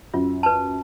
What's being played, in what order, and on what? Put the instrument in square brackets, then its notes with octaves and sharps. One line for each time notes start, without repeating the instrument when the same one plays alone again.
[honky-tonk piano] F#2 [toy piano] F4
[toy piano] B4 A5